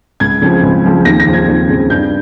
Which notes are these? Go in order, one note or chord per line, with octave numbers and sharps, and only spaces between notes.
C#2 G#6
C#3 F3 C4
C#2
C#3 F3 C4
D#2 A#6
A#6
C#3 F3 C4
G#6
D#2
C#3 F3 C4
G2 G6